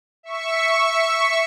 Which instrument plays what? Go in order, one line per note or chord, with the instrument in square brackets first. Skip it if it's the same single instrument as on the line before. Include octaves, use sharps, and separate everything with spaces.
[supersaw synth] E5 C#6